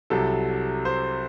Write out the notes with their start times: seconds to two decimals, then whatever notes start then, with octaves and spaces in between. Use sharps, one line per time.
0.10 C2 C3 F#3 A4
0.85 C5